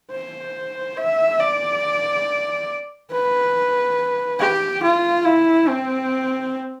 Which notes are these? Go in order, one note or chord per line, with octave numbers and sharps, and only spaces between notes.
C5
E5
D5
B4
G4
F4
E4
C4